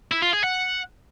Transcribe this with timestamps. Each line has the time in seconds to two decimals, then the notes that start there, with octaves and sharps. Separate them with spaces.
0.12 E4
0.22 F4
0.33 G#4
0.44 F#5